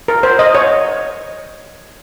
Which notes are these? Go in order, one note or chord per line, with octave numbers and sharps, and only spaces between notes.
A#4
C5
D#5
C#5